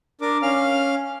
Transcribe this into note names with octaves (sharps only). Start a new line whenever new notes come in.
D4 A#4 D6
C#4 F5 F6